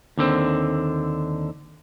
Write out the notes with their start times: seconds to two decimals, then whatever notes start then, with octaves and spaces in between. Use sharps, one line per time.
0.18 D#2 D3 C4